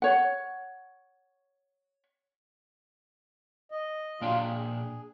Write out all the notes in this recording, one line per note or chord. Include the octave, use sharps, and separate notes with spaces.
C#5 F#5
D#5
A#2 F#3 D4 F4 F5 G5
G#4